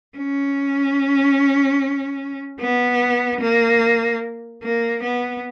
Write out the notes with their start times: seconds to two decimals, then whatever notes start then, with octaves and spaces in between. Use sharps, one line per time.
0.18 C#4
2.60 B3
3.41 A#3
4.63 A#3
5.03 B3